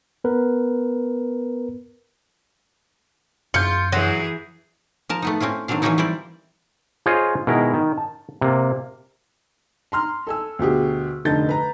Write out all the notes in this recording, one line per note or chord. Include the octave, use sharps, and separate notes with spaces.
B3 A#4 B4
F#2 F4 G6 C#7
E3 F#3 G#4
F3 A#4 A5
A3 B3 D#4
C4 C#4 E4 F4
D#3 F#3 C4 D4 F5
E3 F#3 A#3 C#4 D#4 E4
G3 C4 E4 D5
F4 G#4 C5 C#5 D#5 F5
B2 D#3 G#3 E4 A#4
D#3
A5
C3 A#3
A#5 C6 F6
A4 G#5 E6
D2 B2 G4 G#4
F1 D3 D#4 G6 A6
B4 A#5